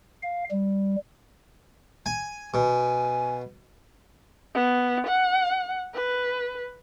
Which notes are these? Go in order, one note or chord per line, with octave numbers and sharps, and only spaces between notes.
F5
G3
G#5
B2 G#5
B3
F#5
B4